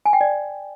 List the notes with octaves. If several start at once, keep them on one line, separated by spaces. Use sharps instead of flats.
G#5
G5
D5